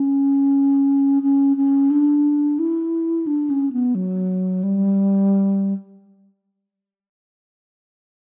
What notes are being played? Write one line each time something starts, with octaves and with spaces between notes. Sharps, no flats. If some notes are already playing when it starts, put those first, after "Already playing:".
Already playing: C#4
C#4
C#4
D4
E4
D4
C#4
B3
F#3
G3